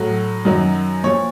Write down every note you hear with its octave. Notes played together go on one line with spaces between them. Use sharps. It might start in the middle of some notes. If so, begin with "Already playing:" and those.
Already playing: A2 F#3
F#2 D#3 F#3
A#2 F3 C#5